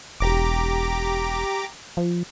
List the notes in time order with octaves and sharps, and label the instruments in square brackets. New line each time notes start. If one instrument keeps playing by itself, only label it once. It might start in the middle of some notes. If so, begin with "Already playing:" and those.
[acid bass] E1 [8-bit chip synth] G4 A#5 D6
[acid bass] F3